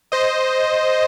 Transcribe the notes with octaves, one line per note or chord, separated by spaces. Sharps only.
C5 D#5